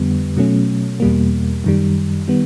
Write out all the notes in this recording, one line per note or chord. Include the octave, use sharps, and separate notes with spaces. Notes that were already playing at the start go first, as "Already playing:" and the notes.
Already playing: F2 D3 G3 B3
B2 F#3 A3 C#4
E2 B2 G3 A#3
F#2 D#3 G3
D#3 G3 B3